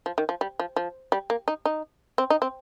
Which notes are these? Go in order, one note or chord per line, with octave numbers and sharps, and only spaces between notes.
F3
D#3
F3
G3
F3
F3
G3
A#3
D#4
D#4
C4
D#4
C4